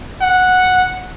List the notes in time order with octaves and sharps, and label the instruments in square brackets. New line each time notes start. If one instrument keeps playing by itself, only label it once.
[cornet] F#5